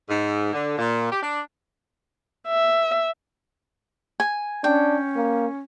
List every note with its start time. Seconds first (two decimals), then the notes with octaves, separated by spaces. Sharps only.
0.09 G#2
0.53 D3
0.78 A#2
1.11 G4
1.23 D4
2.48 E5
4.20 G#5
4.64 C#4 D4 G5
5.16 A#3